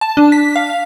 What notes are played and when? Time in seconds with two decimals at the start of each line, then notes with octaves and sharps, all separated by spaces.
0.01 A5
0.17 D4
0.32 B6
0.56 F5